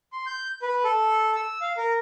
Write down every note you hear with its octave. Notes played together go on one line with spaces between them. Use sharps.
C6
G6
B4
A4
E6
F5
A#4